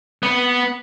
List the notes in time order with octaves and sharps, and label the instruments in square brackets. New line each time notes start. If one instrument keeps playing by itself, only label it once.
[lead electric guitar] B3